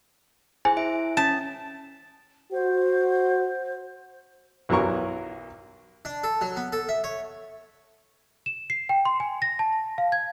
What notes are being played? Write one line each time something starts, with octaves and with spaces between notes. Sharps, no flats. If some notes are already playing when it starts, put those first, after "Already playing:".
E4 G#4 C5 G#5
E4 E5 D7
C#4 A5
F#4 C5
B1 E3 F#3 A#4 C#6
D4
A4
F#3
B3
A4
E5
C#5
E7
C7
G5
C6
G#5
A#6
A5
F5
G#6